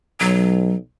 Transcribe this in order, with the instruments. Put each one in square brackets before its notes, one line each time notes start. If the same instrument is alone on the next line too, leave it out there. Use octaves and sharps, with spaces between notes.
[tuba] B1 [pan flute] F#3